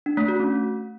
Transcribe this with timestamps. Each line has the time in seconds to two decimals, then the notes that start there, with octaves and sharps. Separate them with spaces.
0.06 D4
0.17 A3
0.28 F#4
0.40 C#4